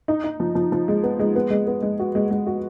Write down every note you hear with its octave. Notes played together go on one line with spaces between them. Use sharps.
D#4
D#4
F3
F3
F3
G#3
B3
G#3
B3
G#3
B3
G#3
F#4
G#3
G#3
F#4